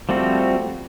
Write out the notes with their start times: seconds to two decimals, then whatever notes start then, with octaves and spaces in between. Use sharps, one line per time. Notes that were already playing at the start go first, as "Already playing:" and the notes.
0.09 F3 G3 A3 C4 F#4